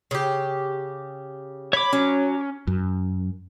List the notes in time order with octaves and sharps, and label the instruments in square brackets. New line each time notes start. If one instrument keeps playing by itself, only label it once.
[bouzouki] C#3 G4
[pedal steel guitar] C#5 D6 [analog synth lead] B5
[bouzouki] F#3 [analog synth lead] C#4
[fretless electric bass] F#2